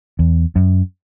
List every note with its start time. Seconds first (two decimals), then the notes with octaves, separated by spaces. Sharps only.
0.19 E2
0.56 F#2